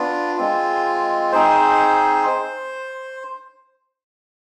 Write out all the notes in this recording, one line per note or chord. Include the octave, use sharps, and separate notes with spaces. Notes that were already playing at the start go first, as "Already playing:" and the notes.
Already playing: B3 D4 F4
G#3 C4 F4
C4 D#4 G#4 C5
C5